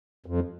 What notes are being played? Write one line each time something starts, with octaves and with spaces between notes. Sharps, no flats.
F2